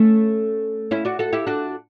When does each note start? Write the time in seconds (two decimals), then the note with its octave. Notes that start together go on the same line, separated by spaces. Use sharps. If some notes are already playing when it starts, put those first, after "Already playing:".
Already playing: A3 C#4
0.91 C#4 E4
1.05 D4 F#4
1.19 F#4 A4
1.33 E4 G4
1.47 D4 F#4